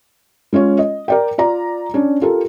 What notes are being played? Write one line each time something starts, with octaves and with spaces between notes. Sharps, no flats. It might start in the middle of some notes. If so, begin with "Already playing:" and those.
G#3 C#4 F4 C#5
D#5
A#4 D5 G5
F4 D5 A#5
C#4 D4
F4 G4 A4 A#4